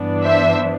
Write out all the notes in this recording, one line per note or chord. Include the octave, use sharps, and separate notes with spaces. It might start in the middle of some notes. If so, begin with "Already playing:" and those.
Already playing: G2 E3 B3 D4
C5 E5